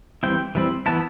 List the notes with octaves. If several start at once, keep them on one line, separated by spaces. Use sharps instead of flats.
E3 G3 C4 E4 G5
E3 G3 C4 E4
E3 B3 E4 A5